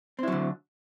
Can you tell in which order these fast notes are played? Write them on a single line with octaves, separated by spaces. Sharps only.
C4 E4 F#3 D3